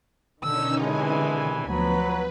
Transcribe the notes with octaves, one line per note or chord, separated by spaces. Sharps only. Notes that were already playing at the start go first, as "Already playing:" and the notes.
B2 D3 D#3 C#4 D#4 E6
C3 E3 G#3 G#5
D2 F3 F#3 B3 B4 B5